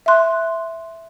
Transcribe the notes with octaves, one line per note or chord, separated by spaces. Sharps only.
E5 C6 F#6